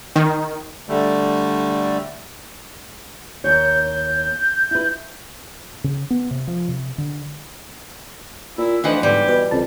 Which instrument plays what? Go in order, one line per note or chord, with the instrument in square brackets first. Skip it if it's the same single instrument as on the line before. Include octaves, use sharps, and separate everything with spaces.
[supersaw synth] D#3
[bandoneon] D3 G3 A3
[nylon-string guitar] D#2 C#5 [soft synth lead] G6
[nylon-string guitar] E4 B4
[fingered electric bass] C#3
B3
C3
F3
C3
D3
[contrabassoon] A#2 [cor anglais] E4
[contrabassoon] D2 [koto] E3 F3 F#5 [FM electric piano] D#4 D#5 G5 [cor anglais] B4
[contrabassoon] B1 [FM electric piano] G#2 D3 [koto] G3 [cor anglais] G4
[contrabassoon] B2 [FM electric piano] B4
[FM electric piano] C2 C#3 A5 [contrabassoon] F2